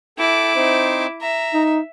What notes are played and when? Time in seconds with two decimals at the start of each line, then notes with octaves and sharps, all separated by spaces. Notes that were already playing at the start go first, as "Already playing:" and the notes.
0.18 E4 A4 G5 D6
0.56 C4 D#4 C5
1.21 E5 A#5
1.54 D#4